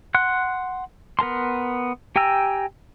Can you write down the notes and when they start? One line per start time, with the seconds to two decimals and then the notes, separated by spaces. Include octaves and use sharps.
0.15 F#5 C6 F#6
1.19 B3 A#4 A5 C6
2.16 G4 G5 G#5 A#5 E6